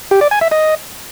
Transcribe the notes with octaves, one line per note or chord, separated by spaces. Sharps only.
G4
D5
G#5
E5
D#5